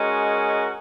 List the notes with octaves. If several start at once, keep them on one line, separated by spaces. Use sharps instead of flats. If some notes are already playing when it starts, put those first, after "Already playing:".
Already playing: G#3 C#4 F#4 A#4 D#5